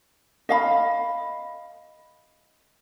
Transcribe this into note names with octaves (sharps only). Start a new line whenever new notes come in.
D#5 F5 B5